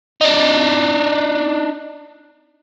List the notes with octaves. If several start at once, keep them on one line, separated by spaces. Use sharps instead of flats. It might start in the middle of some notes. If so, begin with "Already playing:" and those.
D4 D#4